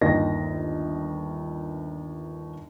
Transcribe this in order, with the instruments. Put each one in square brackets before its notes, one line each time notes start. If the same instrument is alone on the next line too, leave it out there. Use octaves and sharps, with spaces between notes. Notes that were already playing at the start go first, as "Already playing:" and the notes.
[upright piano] G1 D#2 D#3 A#4 D#5 A#6